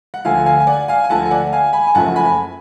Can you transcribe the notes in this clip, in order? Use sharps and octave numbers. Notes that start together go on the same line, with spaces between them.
F#5
D2 D3 F3 F5 G#5
F5 G#5
G#5
D5 F#5
F5 G#5
G#5
D2 D3 F3 F#5 A5
G#5
D5 F#5
F5 G#5
G#5 B5
G#5
F#1 F#2 F3 A3 F#5 A5
G#5 B5